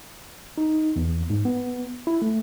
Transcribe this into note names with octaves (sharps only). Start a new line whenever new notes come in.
D#4
E2
G#2
B3
E4
A3